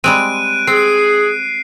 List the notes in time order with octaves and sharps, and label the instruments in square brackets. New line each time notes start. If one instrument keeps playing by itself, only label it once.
[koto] G3 G#3 C4 [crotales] F#6 D7 D#7
[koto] C4 [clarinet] G#4 [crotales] C7